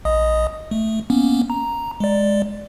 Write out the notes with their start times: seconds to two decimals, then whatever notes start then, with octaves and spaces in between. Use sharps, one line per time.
0.05 A#1 D#5 D#6
0.71 A3
1.10 A#3 B3 C#4
1.50 A#5
2.00 G#3 D5